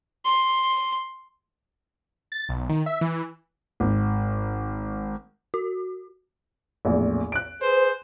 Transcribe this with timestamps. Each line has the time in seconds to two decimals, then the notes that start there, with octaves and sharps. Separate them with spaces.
0.25 C6
2.32 A6
2.49 B1
2.69 D#3
2.86 E5
3.01 E3
3.80 G#1
5.54 F#4
6.85 A#1 E2 A2
7.32 F#6 D7
7.61 G#4 B4 C5